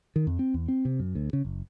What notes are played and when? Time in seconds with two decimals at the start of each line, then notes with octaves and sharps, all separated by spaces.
0.16 D#3
0.27 F2
0.39 C4
0.54 E2
0.68 C4
0.85 C3
0.99 F#2
1.15 D2
1.33 C#3
1.45 F#1